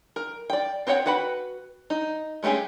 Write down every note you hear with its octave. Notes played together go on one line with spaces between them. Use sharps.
A#4
D5 G5
C4 C5 C#5 F#5 G5
F#4 B4 F#5 G5 B5
D#4
G#3 A3 C#4 G4 G#4